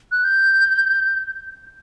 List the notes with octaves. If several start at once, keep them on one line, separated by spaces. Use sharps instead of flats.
F#6
G6